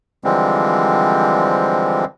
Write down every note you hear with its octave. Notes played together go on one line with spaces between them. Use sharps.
D3 E3 F3 G3 G#3 C4